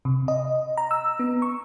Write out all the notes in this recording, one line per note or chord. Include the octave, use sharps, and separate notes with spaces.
C3
D#5
A#5
E6
B3
C#6